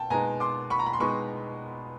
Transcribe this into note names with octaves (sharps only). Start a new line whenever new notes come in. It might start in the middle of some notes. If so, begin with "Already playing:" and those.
Already playing: B2 G5 A5
B2 G#3 B3 D#4 G#5 A#5
C6 D6
B5 C#6
A#5
B5
C6
B2 G#3 B3 D#4 B5 C#6